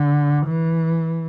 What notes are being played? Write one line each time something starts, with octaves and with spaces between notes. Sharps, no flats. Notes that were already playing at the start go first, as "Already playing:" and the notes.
Already playing: D3
E3